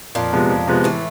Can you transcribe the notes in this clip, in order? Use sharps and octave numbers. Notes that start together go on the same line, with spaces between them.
F2 A#2 A#3
C3 F3 G#3 B3
F2
C3 F3 G#3 B3
A2 E3 A3